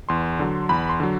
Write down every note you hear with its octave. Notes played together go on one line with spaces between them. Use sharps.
E2 C6
D3 F#3
E2 B5
C6
D3 F#3